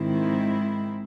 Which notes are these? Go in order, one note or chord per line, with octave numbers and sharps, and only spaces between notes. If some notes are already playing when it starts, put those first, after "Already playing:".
Already playing: G#2 D#3 G#3 C4 E4